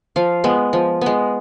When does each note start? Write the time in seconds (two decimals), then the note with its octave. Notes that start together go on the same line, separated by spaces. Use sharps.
0.16 F3 F5
0.44 G#3 B3
0.73 F3
1.01 G#3 B3